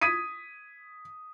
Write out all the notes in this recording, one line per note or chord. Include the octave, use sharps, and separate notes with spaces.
D#6 G#6 B6 D#7